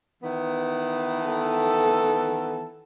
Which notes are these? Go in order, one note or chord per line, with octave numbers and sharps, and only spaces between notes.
D#3 E3 B3
A4